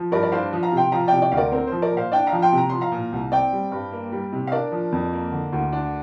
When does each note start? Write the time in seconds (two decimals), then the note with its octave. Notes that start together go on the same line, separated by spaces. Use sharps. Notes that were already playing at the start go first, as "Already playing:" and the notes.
Already playing: F3
0.12 G2 A#4 D5
0.23 D5
0.32 D4 C5 F5
0.53 F3
0.63 F5 A#5
0.73 C3 G5 C6
0.92 F3 F5 A#5
1.08 C3 D5 G5
1.22 D5 G5
1.32 D2 F5
1.37 A#4 D5
1.52 C4 A#4
1.67 F3 C5
1.82 A#4 D5
1.92 A#2
1.97 C5 F5
2.12 D4 D5 G5
2.27 F5 A#5
2.32 F3
2.42 G5 C6
2.52 C3
2.58 A#5
2.70 F3 C6
2.81 F5 A#5
2.92 A#2
3.12 C2
3.32 C4 D5 G5
3.53 G3
3.72 G2
3.92 A#3
4.12 G3
4.33 C3
4.47 F5
4.52 D4 A#4 D5
4.72 F3
4.92 F2
5.13 A#3
5.32 D3
5.53 D2
5.72 D4